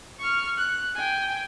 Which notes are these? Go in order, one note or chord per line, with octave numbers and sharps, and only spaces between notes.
C#6 F6
F#6
G5 G#5